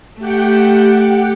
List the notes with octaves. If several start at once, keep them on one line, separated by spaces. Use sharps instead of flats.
A3 G4 F#5 G5